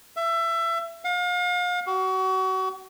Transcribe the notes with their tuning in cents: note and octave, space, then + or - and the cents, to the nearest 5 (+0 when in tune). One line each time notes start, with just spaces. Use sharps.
E5 +25
F5 +40
F#4 +30